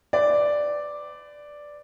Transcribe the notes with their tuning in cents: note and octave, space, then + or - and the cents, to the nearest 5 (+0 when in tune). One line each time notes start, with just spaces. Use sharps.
B4 +40 D5 +0